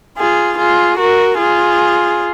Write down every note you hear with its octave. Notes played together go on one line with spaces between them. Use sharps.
F4 G#4
F4 G#4
F#4 A#4
F4 G#4